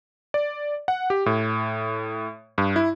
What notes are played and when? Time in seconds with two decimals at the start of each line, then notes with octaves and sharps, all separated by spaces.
0.34 D5
0.88 F#5
1.10 G4
1.26 A2
2.58 G2
2.76 E4